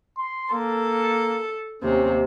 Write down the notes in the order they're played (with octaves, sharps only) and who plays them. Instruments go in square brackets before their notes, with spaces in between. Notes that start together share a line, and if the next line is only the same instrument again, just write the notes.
[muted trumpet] C6
[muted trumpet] A#3 [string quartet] A4
[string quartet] D#2 C3 [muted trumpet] C#4